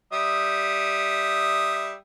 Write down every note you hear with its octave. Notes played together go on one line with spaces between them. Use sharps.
G3 E5 D#6